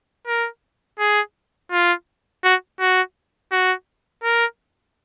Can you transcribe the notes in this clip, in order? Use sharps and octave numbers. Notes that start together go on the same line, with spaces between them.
A#4
G#4
F4
F#4
F#4
F#4
A#4